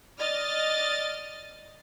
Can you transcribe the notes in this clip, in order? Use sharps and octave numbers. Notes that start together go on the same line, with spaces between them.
D5 D#5 F6 A6